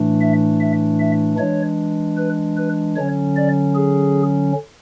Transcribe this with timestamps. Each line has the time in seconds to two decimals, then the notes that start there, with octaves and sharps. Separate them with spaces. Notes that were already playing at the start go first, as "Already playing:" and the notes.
Already playing: A2 E3 A3 D4
0.21 E5
0.60 E5
1.00 E5
1.39 E3 G#3 D4 C#5
2.17 B4
2.57 B4
2.96 D3 F#3 C#4 C#5
3.37 D5
3.76 G#4